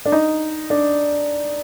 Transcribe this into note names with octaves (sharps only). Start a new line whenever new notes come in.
D4
D#4
D4